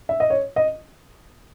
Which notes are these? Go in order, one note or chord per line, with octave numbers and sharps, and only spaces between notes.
E5
D#5
C#5
D#5